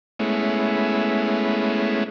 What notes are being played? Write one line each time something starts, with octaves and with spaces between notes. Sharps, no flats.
G#3 A3 B3 C#4 E4